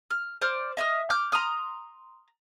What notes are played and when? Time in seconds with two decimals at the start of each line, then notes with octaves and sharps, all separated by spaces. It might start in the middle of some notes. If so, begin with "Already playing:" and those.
0.11 F6
0.42 C5 D5 F6
0.77 D#5 E5 D#6 F6
1.10 D6 F6 G6
1.32 A#5 C6 D#6 F6